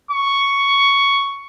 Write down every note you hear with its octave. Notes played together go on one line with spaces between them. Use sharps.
C#6